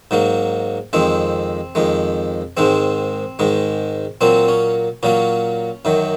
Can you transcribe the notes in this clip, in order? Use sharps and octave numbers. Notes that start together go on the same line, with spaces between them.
G#2 F#3 A#3
F2 D#3 G#3 C4
F2 D#3 G#3
G#2 D#3 G#3 C4
G#2 D#3 G#3
A#2 F#3 A#3 C4
C#4
A#2 F#3 A#3 C#4
F#2 D#3 F#3